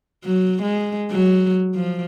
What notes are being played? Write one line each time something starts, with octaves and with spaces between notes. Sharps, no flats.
F#3
G#3
F#3
F3